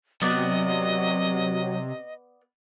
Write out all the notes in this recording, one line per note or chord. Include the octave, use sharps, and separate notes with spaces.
C3 F#3 B3 D5 D#5